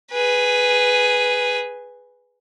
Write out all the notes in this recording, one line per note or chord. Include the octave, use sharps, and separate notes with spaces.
G#4 B4